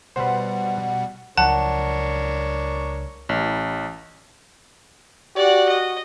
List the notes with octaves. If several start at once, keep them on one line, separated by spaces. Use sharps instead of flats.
B2 G3 B4 C5 F#5
C#2 F3 F#3 D4 A#4 C#5 F#5 A5
A1
F#4 G4 D5 F#5
D#5